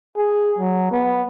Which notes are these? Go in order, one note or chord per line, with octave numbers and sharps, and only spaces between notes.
G#4
F#3
B3